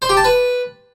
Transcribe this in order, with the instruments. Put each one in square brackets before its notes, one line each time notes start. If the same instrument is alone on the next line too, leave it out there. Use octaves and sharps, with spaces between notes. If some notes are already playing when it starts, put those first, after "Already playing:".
[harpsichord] C5
G4
A5
B4